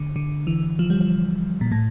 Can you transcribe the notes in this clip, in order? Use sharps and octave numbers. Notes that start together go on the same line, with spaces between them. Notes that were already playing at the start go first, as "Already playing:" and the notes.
Already playing: D3
D3
E3
F3
G3
F3
A#2
A2